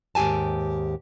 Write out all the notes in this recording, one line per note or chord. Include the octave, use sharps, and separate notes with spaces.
D#2 G#2 G4 G#5 A5